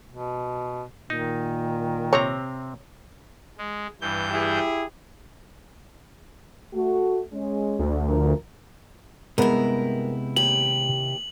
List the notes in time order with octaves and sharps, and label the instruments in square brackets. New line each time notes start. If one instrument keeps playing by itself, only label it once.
[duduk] B2
[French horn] A#2 [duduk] D#3 [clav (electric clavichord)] D#4
[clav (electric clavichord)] C3 C4 A#5 [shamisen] C#5
[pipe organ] G#3
G2 E3 G6
[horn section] E4 G4 G#4
[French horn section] A3 F#4
G#3 C#4
[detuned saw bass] D2
[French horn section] D3 F3 A#4
[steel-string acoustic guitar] G2 A#4 [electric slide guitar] C3 E4 [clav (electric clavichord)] G#3 B3 B4
[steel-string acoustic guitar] D#2 G4 [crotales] F#7